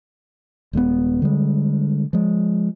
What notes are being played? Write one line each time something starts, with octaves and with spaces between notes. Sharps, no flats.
D#1 G#3 A3 B3
D3 G3 G#3
F3 G#3